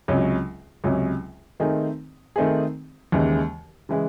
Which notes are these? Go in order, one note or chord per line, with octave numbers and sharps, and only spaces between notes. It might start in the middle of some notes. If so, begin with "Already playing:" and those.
C#2 C3 F#3 C#4
C#2 C3 F#3 C#4
D#3 A3 C4 D#4 G#4
D#3 A3 C4 D#4 G#4
D#2 C#3 E3 G#3
C#3 E3 G#3